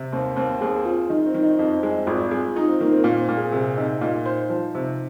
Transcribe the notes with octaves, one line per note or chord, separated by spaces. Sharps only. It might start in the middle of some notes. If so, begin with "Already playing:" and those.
Already playing: C3
D#2 C4
D#2 C4
D#2 G#4
C4 F4
D#3 D#4
C4
D#3
D#4
F2 D#4
C4
G#3
D#4
G#1 F4
G#3
D#4 F4
C4
D#3 A#3
C4
A#2 C4
C4
A#2
G#4
C3 G#4
C3 D#4
A#2 D#4
C5
F3
C3